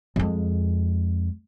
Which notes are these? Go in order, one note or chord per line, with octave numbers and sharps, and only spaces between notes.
F2 G#3